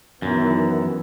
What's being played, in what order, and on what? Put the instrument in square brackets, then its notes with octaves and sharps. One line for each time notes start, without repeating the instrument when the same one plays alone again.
[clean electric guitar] F#2 [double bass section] D#3 E3 B3